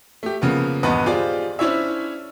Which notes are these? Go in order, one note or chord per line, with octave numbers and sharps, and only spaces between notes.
A3 G4
C#3 F3 A#3 B3
D#1 E2 G2 B3 B4 D#5
F4 G4 G#4 C5 D5
C#4 D4 E4 C5 C#5 E5